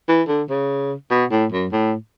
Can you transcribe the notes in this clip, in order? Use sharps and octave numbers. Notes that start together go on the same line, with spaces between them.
E3
D3
C#3
B2
A2
F#2
A2